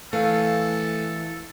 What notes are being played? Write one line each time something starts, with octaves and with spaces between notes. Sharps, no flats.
E3 A3 A4 F5